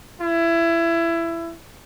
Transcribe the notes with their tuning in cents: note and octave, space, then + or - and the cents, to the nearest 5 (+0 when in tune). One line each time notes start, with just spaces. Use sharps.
E4 +20